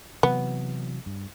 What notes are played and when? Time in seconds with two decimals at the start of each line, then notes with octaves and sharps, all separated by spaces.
0.23 C3 E3 F#3 B3
1.06 G2